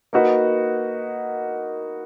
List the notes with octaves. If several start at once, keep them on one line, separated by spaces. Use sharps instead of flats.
A#3 D#4 F#4 B4